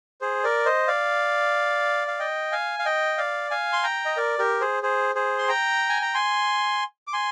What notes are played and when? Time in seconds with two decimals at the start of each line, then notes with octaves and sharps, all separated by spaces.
0.21 G#4 C5
0.44 A#4 D5
0.65 C5 D#5
0.88 D5 F5
2.08 F5
2.19 D#5 G5
2.52 F5 G#5
2.79 F5
2.85 D#5 G5
3.18 D5 F5
3.51 F5 G#5
3.73 C6
3.83 G5 A#5
4.05 D#5
4.17 A#4 D5
4.39 G4 A#4
4.61 G#4 C5
4.83 G#4 C5
5.15 G#4 C5
5.38 C6
5.48 G5 A#5
5.89 G#5
6.02 A#5
6.14 G#5 C6
7.07 D6
7.13 G#5 C6